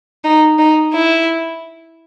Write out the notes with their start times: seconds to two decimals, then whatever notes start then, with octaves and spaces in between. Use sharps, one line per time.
0.24 D#4
0.59 D#4
0.93 E4